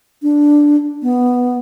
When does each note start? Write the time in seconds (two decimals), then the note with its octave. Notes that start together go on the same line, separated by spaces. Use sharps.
0.23 D4
1.03 B3